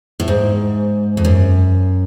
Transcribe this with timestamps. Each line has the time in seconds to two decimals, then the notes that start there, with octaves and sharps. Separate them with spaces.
0.20 A2
0.28 G#2
1.17 F2
1.25 F#2